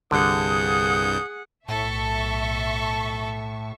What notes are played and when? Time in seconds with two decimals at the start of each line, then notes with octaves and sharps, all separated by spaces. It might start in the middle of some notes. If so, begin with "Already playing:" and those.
0.11 C2 G2 D3 G#4 F#5 D#6 G6
1.69 B1 A2 A4 E5 A5 C#6